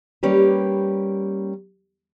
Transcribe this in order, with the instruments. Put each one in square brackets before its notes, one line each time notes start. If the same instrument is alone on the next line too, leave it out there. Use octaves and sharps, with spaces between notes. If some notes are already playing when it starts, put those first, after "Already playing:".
[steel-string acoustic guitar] G3 A#3 C#4 G4 B4